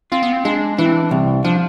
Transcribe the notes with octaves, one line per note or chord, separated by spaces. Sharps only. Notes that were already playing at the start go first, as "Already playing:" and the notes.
C4 F4
B3
C4
G#3 D4
E3 D4
C4
D4
C2 C4
F3 D4